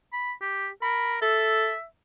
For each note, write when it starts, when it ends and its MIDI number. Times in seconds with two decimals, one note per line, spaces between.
0.13 0.33 83
0.41 0.69 67
0.82 1.19 70
0.82 1.17 83
1.22 1.73 69
1.22 1.85 76